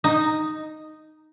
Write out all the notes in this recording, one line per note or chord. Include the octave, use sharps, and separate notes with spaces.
D#4